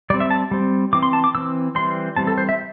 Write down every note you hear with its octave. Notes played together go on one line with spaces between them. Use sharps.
G3 C4 D5
E5
A5
G3 C4
E3 C4 D6
C6
A5
D6
E3 C4 E6
E3 G3 C4 C6
E3 G3 C4 A5
A4
C5
E5